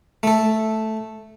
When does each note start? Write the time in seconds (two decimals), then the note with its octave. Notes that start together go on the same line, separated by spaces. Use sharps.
0.23 A3 A4